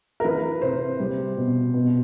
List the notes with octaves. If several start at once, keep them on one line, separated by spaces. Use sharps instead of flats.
A#4
E3 B4
C3 C5
G3
B2
B2